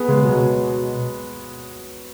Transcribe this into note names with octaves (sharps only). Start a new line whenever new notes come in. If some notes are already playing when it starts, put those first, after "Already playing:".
Already playing: B3 G#4
C#3 G#3
B2 F#3